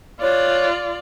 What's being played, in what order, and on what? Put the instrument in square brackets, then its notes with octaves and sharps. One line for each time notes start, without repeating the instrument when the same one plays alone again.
[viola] F4 D5 [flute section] C#5 F#6